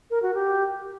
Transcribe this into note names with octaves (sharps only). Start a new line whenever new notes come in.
A#4
F#4
G4